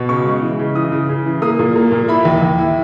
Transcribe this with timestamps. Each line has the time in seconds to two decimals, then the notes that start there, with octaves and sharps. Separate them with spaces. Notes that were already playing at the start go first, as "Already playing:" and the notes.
Already playing: B2
0.09 C#3 C#6
0.25 G#3
0.41 E3
0.59 C#3
0.75 E3 D#6
0.92 C#3
1.09 C#3
1.26 E3
1.42 A#3 D#6
1.59 A#2
1.76 A#3
1.92 A#2
2.08 E4 B5
2.25 D#2
2.42 D#2
2.58 E4